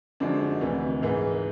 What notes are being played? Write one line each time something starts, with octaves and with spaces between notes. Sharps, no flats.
F#2 D3 F3 G#3 D4
D#4
D2 C3 E3
G#2 E3 G#3